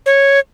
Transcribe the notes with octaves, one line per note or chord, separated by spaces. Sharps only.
C#5